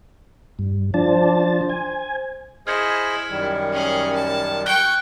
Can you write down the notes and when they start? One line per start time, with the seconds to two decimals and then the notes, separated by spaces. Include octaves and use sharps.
0.59 G2
0.94 F3 D4 C5 A5
1.69 G#5
2.67 E4 G#4 C5 D#5 F6 G#6 C#7
3.30 F#2 D#3 G3
3.72 C#4 G#4
4.15 A5
4.66 G5 C#6 F#6 G7